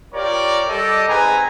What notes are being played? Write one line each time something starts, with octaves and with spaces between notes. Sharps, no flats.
F4 G4 A#4 C#5 D5
G3 G4 A4 D5 D#5
C4 D#4 G#4 B4 G#5 A#5